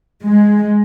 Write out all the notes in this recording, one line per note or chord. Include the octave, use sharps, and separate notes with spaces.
G#3